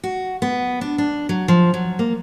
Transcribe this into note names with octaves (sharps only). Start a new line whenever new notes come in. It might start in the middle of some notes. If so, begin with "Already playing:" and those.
F#4
B3
D4
D4
F#3
F3
F#3
A#3